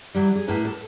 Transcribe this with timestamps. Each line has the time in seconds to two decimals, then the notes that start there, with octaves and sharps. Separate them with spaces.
0.15 E3 F#3 G3
0.36 G#4
0.48 A2 A#3 B4 A5
0.65 A4